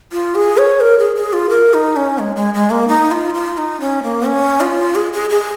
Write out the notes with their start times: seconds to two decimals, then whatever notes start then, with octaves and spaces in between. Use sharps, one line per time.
0.12 F4
0.35 G#4
0.58 C#5
0.81 A#4
0.99 G#4
1.16 G#4
1.33 F4
1.50 A#4
1.74 D#4
1.96 C#4
2.19 G#3
2.36 G#3
2.54 G#3
2.70 A#3
2.88 D#4
3.11 F4
3.34 F4
3.58 D#4
3.80 C#4
4.03 A#3
4.26 C#4
4.61 F4
4.95 G#4
5.13 G#4
5.30 G#4